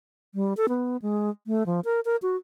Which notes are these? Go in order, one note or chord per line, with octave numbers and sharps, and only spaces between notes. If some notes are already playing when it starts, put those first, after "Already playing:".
G3
A4
B3
G#3
A3
F3
A#4
A#4
F#4